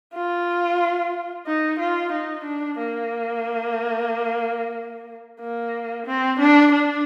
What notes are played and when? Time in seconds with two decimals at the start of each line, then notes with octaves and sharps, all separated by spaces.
0.15 F4
1.47 D#4
1.80 F4
2.12 D#4
2.44 D4
2.78 A#3
5.41 A#3
6.06 C4
6.39 D4
6.72 D4